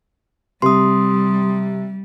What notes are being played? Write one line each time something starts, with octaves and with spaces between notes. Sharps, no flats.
C3 G3 C6 D#6